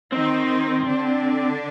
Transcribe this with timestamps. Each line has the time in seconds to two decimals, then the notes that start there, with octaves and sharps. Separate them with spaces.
0.12 D#3 C4 D#4
0.87 D3 D4